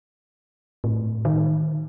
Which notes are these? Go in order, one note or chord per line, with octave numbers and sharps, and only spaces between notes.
A2
D#3